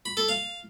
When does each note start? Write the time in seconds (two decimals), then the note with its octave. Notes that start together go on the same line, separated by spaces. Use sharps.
0.05 B5
0.17 A4
0.29 F5